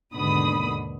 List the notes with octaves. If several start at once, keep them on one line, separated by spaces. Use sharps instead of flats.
D#2 G#2 B2 D3 B5 D#6